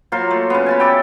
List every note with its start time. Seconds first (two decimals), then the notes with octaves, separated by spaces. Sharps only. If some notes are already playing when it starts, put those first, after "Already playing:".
0.12 F#3 A#3 F4 C5
0.30 A3
0.50 C#3 B3
0.66 G#5 A5 B5
0.80 D5 E5 G5